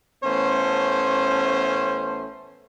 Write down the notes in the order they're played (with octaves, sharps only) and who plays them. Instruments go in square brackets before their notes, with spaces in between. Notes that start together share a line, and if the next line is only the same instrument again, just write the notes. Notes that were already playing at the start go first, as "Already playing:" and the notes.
[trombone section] A1 A3 B3 C#4 C5